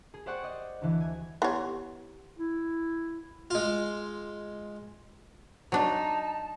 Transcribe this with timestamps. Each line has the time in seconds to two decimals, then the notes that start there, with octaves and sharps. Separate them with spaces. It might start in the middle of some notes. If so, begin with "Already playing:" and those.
0.14 G#4
0.26 G4 C5 D5 F#5 G5 C#6
0.43 D5 D#5
0.81 D2 E3
1.01 G#5
1.42 B3 E4 G4 C#5 C6
2.39 E4
3.50 G#3 F4
5.72 F#3 D4 D#4 A5